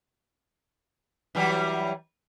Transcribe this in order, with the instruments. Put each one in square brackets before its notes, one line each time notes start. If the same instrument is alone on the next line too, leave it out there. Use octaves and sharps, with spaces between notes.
[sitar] E3 F#3 G3